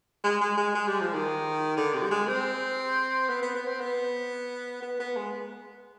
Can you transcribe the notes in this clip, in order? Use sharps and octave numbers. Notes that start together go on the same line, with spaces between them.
G#3
G#3
G#3
G#3
G3
F3
D#3
D3
C3
G3
G#3
C4
B3
B3
B3
C4
B3
B3
B3
G#3